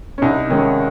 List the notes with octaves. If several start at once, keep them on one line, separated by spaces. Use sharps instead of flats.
C#4
C2 D#4
C3 D#3 G#3 C#4